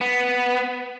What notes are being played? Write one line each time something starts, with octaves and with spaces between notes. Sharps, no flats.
B3